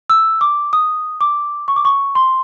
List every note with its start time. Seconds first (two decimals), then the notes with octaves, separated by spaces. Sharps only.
0.10 E6
0.41 D6
0.73 D#6
1.21 D6
1.68 C#6
1.76 D6
1.85 C#6
2.15 C6